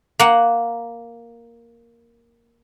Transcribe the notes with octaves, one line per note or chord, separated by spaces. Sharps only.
A#3 F#5